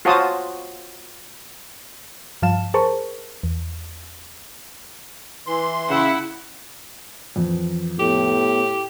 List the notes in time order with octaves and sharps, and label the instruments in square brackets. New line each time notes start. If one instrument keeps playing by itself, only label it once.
[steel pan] F4 F#4 C5 C#5 A5 D#6
[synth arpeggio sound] G2 F3 F5 A5 E7
G#4 A#4 C5 A5 C#6
E2
[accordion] E3 C6
[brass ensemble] C#3 E5 [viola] E4 F#5
[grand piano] F2 [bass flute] E3
[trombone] A2 [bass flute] B3 [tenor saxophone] G4